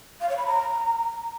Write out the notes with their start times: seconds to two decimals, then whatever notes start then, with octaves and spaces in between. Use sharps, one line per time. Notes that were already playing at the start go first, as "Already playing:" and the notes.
0.21 F5
0.29 C#5
0.38 B5
0.46 A#5